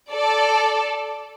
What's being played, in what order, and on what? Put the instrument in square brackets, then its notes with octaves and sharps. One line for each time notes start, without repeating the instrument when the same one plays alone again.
[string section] A4 D5